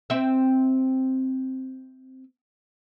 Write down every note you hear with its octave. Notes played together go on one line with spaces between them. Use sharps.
C4 E5